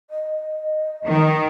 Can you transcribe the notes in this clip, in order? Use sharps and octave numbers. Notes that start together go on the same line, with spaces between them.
D#5
D#3